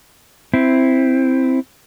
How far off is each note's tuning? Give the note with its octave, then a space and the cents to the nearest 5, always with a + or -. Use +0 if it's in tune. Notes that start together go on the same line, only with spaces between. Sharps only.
C4 +0 E4 +0